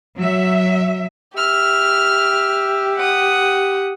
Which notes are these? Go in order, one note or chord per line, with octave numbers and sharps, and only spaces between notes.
F#3 E5
G4 E5 F6
F#5 D#6